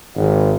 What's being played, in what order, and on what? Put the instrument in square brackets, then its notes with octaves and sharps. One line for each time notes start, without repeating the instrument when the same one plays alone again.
[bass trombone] G#1